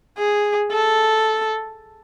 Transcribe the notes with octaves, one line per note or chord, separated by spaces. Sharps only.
G#4
A4